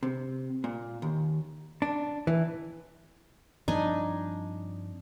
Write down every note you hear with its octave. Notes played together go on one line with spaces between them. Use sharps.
C3
A#2
D#2
D4
E3
G2 F3 C4 D4 D#4 G#5